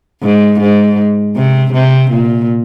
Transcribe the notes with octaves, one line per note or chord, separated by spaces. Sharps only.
G#2
G#2
C3
C3
A#2